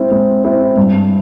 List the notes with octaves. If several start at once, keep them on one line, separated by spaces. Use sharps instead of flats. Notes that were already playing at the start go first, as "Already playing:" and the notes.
Already playing: G#3 C4 E4
G#3
C4 E4
G2